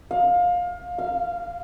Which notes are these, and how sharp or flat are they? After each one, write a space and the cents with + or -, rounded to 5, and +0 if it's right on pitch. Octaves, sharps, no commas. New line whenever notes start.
F5 +25
F5 -15